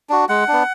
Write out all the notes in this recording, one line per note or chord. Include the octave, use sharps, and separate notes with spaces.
D4 F#4
G#3 F#5
B3 D4